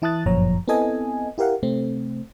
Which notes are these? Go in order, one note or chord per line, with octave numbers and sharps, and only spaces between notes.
E3 E4 A5 D#6 F#6 A6
G1 F#2 A#2 F3 C#5 A#5
B3 C4 E4 A4 D#5 G#5
E4 G4 A#4 F5 F#5
C3 A3 C4